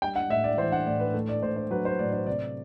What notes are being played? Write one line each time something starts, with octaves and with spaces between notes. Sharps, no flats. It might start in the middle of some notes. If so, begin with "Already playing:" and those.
G3 G5
F#5
A2 E5
D5
E3 C5
F#5
A2 D5
B4
A3
D5
A2 C5
C5
F#3 B4
C5
A2 D5
C5
C3 D5